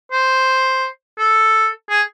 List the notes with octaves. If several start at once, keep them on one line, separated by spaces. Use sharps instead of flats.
C5
A4
G#4